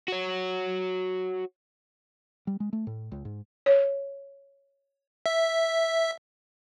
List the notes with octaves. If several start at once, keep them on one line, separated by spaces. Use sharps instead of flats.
F#4 C#5
G3
G#3
A3
A2
C#2
G#2
C#5
E5